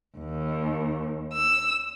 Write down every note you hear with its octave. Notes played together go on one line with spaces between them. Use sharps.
D#2
E6